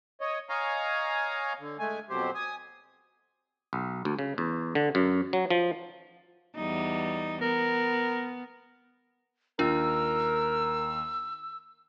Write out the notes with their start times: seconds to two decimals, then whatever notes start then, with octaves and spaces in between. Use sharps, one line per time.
0.21 C#5 D#5
0.49 C#5 D#5 F5 G#5 A#5
1.60 D3
1.79 G#3 A3 G#5
2.10 F2 B2 F#3 G4 C5
2.35 G#5 D#6
3.73 B1
4.05 D2
4.19 C#3
4.38 E2
4.75 D3
4.95 F#2
5.33 F#3
5.50 F3
6.56 E2 G3 D#4
7.42 B3 A#4
9.59 D#2 D4 F4 A#4 E6